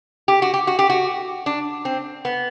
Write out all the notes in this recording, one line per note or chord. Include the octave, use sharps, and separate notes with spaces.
G4
F#4
G4
F#4
G4
F#4
D4
C4
B3